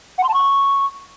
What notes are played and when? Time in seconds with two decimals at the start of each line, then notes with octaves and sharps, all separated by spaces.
0.18 F#5
0.24 C6
0.29 A5
0.34 C#6